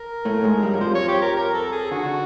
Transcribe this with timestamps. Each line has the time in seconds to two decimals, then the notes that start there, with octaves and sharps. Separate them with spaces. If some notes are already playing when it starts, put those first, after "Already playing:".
Already playing: A#4
0.25 A2 A3
0.44 G#2 G#3
0.62 G2 G3
0.74 F#3
0.80 F2 F3 C5
0.95 C#5
1.08 G4
1.21 A#4
1.36 A#4
1.54 A4
1.72 G#4
1.91 D3 F#4
2.05 D3